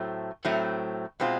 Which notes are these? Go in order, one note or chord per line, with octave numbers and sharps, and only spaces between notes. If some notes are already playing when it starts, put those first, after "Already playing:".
Already playing: A2 F#3 A3 C4
A2 F#3 A3 C4
B2 G#3 C4 F4